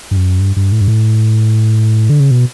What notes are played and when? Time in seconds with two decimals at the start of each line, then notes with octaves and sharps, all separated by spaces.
0.11 G2
0.16 F#2
0.40 G2
0.56 G2
0.72 A2
0.81 G2
0.88 A2
2.10 D3
2.20 C#3
2.31 B2